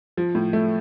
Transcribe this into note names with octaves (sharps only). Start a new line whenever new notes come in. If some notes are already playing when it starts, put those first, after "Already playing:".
F3
A2
A3